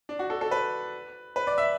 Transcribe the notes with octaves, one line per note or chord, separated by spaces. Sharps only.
D4
F#4
A4
A4
B4
B4
D5
E5